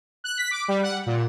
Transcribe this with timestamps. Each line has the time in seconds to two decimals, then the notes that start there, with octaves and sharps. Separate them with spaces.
0.24 F#6
0.38 B6
0.51 D6
0.68 G3
0.83 F#5
1.06 A#2